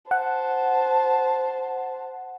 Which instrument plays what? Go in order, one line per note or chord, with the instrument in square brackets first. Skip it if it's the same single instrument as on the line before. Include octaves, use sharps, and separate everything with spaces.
[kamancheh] C5 A5 [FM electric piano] F#5